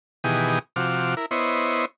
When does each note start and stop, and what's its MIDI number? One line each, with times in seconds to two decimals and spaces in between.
0.24 0.59 47
0.24 0.59 51
0.24 0.59 52
0.24 0.59 67
0.24 0.59 68
0.24 0.59 87
0.76 1.15 48
0.76 1.15 53
0.76 1.15 66
0.76 1.15 86
0.76 1.15 89
1.17 1.26 64
1.17 1.26 70
1.31 1.85 59
1.31 1.85 64
1.31 1.85 72
1.31 1.85 73
1.31 1.85 75